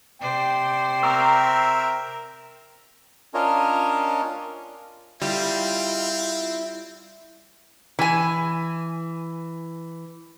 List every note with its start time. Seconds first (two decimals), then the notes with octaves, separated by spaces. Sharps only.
0.21 C3 C5 D5 G5
1.03 C4 A#4 E5 A#5 C#6 E6
3.34 C#4 D4 F4 A#4 C#5 D#5
5.22 G3 C4 E4 F4
7.99 E3 G#5